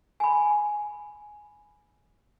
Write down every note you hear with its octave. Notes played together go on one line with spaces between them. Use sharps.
G#5 B5